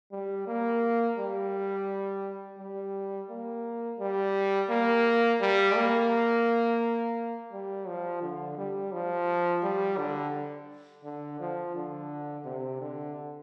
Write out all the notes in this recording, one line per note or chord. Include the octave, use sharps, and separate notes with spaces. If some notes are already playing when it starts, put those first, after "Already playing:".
G3
A#3
G3
G3
A#3
G3
A#3
G3
A#3
G3
F3
D3
G3
F3
G3
D3
D3
F3
D3
C3
D3